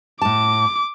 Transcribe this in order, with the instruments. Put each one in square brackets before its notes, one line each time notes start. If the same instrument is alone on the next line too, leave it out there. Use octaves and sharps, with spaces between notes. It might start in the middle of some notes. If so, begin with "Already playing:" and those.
[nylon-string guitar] A2 A5 [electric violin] D6